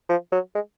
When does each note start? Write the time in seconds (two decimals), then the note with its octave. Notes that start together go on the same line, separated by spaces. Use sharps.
0.09 F3
0.32 F#3
0.55 G#3